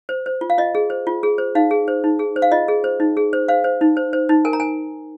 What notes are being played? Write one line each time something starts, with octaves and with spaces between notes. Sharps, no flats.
C5
C5
F4
F5
F4 D#5
G#4
C5
F4
G#4
C5
D#4 F5
G#4
C5
D#4
G#4
C5
F5
F4 D#5
G#4
C5
D#4
G#4
C5
C5 F5
C5
D#4
C5
C5
D#4
A#4 G#5
A#5
G#5